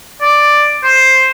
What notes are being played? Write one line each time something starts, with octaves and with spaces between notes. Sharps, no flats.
D5
C5